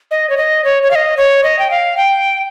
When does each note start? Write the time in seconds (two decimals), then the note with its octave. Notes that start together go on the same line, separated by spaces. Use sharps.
0.11 D#5
0.30 C#5
0.37 D#5
0.64 C#5
0.83 C#5
0.91 F5
0.95 D#5
1.17 C#5
1.44 D#5
1.59 G5
1.71 F5
1.97 G5